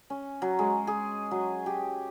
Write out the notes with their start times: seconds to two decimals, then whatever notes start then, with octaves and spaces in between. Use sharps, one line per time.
0.10 C#4
0.42 F#3
0.59 G#3
0.87 G#4
1.31 F#3
1.66 G4